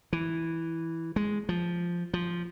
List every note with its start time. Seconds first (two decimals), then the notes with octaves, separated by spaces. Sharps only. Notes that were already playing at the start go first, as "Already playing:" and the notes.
0.13 E3
1.16 G#3
1.49 F3
2.14 F3